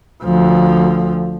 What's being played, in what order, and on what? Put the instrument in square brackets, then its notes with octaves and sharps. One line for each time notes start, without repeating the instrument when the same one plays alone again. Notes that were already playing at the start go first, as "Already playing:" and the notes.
[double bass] D2 F3